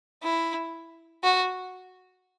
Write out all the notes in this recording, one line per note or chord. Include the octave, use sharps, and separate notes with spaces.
E4
F#4